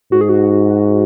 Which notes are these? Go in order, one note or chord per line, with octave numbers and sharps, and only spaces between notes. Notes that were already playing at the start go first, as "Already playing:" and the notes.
G#2 F#4
G#4
F#4